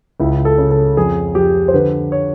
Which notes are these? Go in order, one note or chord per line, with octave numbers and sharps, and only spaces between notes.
C#2 E4
A4
C#3
A4
F2 G#4
F2 G4
C5
D3 B4
C#5